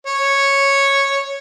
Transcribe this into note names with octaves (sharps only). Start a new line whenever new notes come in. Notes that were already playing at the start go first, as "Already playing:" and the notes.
C#5